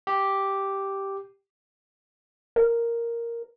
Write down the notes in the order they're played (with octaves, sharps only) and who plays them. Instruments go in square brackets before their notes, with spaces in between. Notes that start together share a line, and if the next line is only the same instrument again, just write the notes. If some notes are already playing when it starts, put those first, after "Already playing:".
[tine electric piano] G4
[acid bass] A#4